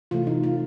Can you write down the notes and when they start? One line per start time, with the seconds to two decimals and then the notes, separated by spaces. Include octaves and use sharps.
0.11 C3 E3 A3 F4
0.27 D#4
0.43 F4